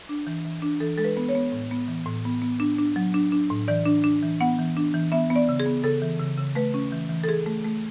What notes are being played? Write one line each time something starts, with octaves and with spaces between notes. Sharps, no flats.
D4
E3
E3
D4
E3 A4
G#3 A4
B4
B3
C#5
B3
A2
B3
E3
A2
B3
B3
D4
D4
F#3
D4
D4
A2
E3 D5
D4
D4
E3
B3 F#5
E3
D4
E3
B3 E5
B3
D5
C#3
G#4
B3
C#3 A4
E3
C#3
C#3
A3 B4
C#4
E3
E3
A4
E3 G#4
A3
A3